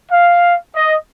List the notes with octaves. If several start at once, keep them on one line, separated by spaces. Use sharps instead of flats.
F5
D#5